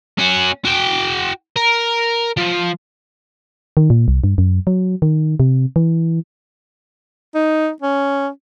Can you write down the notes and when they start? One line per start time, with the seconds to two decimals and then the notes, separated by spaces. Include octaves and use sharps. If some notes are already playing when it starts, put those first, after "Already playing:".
0.18 C#4 F#4
0.65 F#4 G5
1.56 A#4
2.38 F3
3.77 D#3
3.90 A#2
4.08 C2
4.24 G2
4.38 F#2
4.67 F#3
5.02 D#3
5.40 C3
5.76 E3
7.35 D#4
7.82 C#4